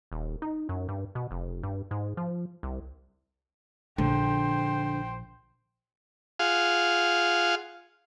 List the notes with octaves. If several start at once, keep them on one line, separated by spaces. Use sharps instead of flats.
D#1
D#4
F#2
G2
B2
F1
G2
G#2
F3
C2
A#1 D3 C5 G5
F4 G#4 F5 F#5